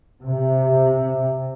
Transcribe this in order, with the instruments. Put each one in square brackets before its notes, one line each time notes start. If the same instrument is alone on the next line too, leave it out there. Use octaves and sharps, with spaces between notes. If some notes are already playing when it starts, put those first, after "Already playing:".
[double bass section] C3